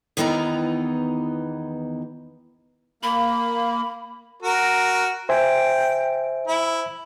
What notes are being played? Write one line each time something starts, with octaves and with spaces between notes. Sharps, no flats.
E2 D#3 E3 B3 D#4 A#5
A#3 B5
F#4 A#4
C5 E5 G5 G#5
E4